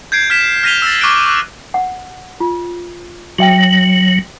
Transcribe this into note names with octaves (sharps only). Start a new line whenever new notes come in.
G6 G#6 C7 D7
F6 G#6 B6 E7
F6 A#6 B6 D#7 F7 G7
E6 A6
C#6 D6 F6 F#6 B6 D7
C#6 F#6
F#5
F4
F#3 F#4 E5 G5